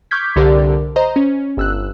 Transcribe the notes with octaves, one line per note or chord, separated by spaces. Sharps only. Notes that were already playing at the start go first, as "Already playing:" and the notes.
C#6 D6 F6 G6 G#6 B6
C2 D3 G4 A#4 D5
C5 D#5 A#5
C#4
G1 E6 F#6